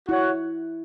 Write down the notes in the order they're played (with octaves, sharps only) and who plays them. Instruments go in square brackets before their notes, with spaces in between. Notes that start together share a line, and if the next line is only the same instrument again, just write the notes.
[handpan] E4 [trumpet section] F#4 C#5 F#5